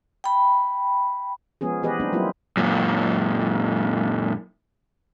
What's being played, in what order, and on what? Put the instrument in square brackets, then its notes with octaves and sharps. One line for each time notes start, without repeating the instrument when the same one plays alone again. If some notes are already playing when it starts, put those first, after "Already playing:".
[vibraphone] G5 B5
[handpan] F3 G#3 B3 C#4 G#4
E3 B3 G4 G#4 B4 D#5
G3 A3 C4 D4 D#4
F#3 G3 A#3 C4 E4 F4
[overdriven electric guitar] F#2 A#2